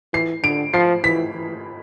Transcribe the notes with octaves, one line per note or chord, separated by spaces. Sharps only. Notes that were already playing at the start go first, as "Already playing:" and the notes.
E3 C7
D3 D7
F3 C7
E3 B6
E3